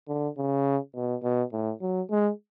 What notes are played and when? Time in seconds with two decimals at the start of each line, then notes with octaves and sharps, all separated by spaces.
0.08 D3
0.37 C#3
0.95 B2
1.23 B2
1.52 A2
1.81 F#3
2.11 G#3